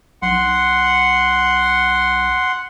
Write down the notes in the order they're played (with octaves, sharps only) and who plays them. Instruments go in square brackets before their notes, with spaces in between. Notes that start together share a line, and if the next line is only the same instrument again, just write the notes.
[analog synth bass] B1 [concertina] F#5 C6